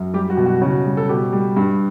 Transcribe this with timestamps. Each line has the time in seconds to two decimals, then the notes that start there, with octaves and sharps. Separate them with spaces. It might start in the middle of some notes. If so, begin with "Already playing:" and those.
Already playing: F#2
0.14 G3 G4
0.30 F#4
0.37 B2
0.46 F#4
0.62 C#3 F#4
0.86 G3
0.97 A4
1.09 B2 G4
1.33 G3
1.57 G2